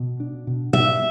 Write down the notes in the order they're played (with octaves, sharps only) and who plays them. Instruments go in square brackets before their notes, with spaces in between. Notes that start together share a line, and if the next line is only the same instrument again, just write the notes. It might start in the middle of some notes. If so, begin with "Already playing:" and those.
Already playing: [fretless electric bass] B2
D4
B2
[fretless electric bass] B2 [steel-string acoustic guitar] E5